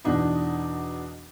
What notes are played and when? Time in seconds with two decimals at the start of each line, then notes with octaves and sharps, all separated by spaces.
0.05 E2 B2 D4 D#4